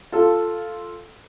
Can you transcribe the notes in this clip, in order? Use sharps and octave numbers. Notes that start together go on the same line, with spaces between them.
F4 A4